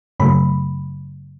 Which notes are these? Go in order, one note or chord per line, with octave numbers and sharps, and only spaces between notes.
F#2 C#3 F#3 A3 B5